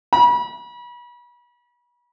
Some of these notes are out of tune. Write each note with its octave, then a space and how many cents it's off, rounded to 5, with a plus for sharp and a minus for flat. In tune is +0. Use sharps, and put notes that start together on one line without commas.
B5 -35